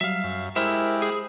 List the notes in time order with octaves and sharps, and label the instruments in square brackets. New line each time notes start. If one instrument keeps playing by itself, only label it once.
[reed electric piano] F#3 G3 [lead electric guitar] E5 F5
[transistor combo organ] F#2
[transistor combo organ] G#3 G4 [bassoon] E4 [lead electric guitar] A#4 E5 [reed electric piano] C5
[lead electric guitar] G#4